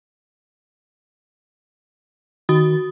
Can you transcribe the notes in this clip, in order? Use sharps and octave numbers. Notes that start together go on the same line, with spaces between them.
D#3 F#4 D#6